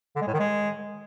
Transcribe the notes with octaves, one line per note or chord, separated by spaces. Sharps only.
D3
G#3
A2
D#3
G#3